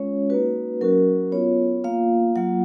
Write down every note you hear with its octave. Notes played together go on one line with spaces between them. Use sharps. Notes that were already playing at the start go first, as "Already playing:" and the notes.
Already playing: G#3 C#4 F4 C#5
A#3 D#4 F#4 B4
F#3 C#4 F#4 A#4
B3 F4 C#5
A#3 F4 F5
F#3 A#3 F4 F#5